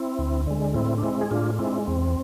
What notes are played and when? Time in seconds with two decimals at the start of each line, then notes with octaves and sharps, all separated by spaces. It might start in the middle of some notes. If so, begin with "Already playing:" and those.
Already playing: C4 E4
0.19 D2
0.47 D3 G#3
0.74 A2 C4 E4
0.98 D4
1.03 G#3 C4 E4
1.21 G#4
1.31 A2 D4 F4
1.59 G#3 C4 E4
1.87 E2 C4